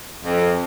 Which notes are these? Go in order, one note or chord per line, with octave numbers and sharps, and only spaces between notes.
F2